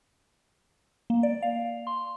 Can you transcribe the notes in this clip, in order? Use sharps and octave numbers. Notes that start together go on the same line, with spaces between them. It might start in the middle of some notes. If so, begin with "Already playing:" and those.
A#3
D5
F5
C6